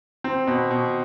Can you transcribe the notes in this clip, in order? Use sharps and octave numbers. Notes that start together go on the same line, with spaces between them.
C4
B2
B2